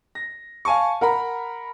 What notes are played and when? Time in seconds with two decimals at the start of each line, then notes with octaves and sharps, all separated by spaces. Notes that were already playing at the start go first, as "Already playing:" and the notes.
0.15 A#6
0.65 F5 G#5 A5 C#6
1.01 A#4 F#5 A#5 B5